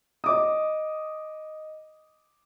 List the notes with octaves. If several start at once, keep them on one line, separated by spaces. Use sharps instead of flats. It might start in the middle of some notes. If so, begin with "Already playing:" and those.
D#5 D6 D#6